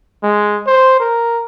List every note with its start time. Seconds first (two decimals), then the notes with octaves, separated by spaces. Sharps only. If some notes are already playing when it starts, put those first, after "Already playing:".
0.23 G#3
0.67 C5
1.00 A#4